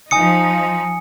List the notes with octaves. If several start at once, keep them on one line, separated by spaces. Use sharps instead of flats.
F3 D#4 G#5 D#6 C#7